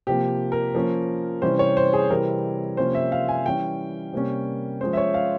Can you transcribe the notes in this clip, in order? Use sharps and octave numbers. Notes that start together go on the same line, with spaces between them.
C3 F3 A#3 G4
A#4
F3 A#3 C#4
C3 E3 G3 C#4 C5
C#5
C5
G#4
C3 E3 G3 C4 A#4
C3 F3 A#3 C#4 C5
E5
F5
G#5
E3 G3 C#4 G5
C3 G3 A#3 C#4
F3 G#3 C#4 C5
E5
C#5
F5